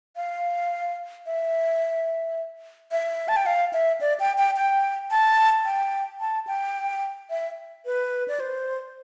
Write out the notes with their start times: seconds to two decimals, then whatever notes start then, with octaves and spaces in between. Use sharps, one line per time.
0.16 F5
1.26 E5
2.92 E5
3.28 A5
3.36 G5
3.46 F5
3.73 E5
4.01 D5
4.20 G5
4.38 G5
4.56 G5
5.11 A5
5.65 G5
6.20 A5
6.47 G5
7.30 E5
7.86 B4
8.28 D5
8.40 C5